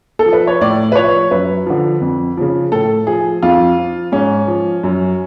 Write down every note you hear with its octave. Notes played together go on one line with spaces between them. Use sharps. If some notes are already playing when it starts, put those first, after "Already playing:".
A4
F3
B4
C#5
A2 D5
B4
F3 C#5
F#2 B4
D3 F3
F2
C#3 F3
A2 A4
F3 G#4
F2 F4
F3
G#2 C#4
F3
F#2